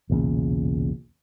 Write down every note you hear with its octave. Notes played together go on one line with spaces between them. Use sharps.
B1 E2 A#2 C#3